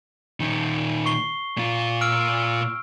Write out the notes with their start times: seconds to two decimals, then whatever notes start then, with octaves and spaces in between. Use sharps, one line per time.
0.40 A#2 D#3
1.06 C#6 C7 G7
1.57 A#2 F4
2.01 E6 F6 D7